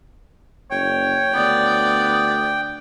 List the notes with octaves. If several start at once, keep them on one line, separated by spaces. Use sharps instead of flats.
F#1 C#5 G5
D2 B3 D5